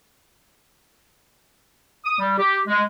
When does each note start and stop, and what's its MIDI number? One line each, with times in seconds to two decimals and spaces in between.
2.05 2.18 87
2.19 2.34 55
2.38 2.59 67
2.68 2.80 56